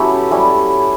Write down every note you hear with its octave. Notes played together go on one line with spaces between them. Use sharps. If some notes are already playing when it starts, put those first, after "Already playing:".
Already playing: F#3 B3 C#4 E4 G4 A4
G3 C#4 E4